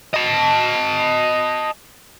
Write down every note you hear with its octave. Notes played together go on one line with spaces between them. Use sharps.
D#5 A5